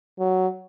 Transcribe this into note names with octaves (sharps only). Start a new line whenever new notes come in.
F#3